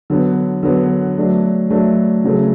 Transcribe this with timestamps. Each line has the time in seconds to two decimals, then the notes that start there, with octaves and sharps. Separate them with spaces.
0.10 D3 F#3 B3
0.63 D3 F#3 B3
1.17 F#3 A3 D4
1.70 F#3 A3 D4
2.24 C#3 F#3 A3